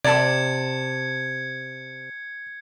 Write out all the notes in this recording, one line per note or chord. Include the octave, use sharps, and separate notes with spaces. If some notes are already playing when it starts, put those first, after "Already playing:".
C3 D5 A5 G#6 C#7